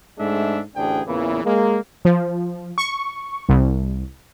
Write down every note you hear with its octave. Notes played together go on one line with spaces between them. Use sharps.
G#2 G#3 A3 D4 E5
A1 D2 D4 G#4 G5
E2 A#2 C#3 E3
G#3 A#3
F3
C#6
C2